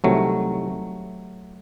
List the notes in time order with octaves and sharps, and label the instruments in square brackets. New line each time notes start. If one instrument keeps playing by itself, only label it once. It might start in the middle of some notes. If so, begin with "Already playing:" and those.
[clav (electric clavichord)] C2 C3 D#3 F#3 A3